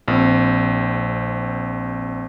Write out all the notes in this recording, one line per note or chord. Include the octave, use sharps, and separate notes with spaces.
A#1 C4